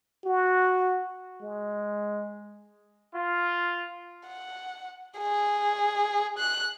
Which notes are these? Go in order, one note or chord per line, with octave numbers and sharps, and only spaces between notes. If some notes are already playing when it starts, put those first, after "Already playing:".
F#4
G#3
F4
F#5
G#4
F#6